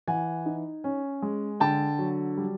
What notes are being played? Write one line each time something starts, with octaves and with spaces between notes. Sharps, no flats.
E3 F#5 G#5
D#4
C#4
G#3
D3 G5 A5
F#3
G3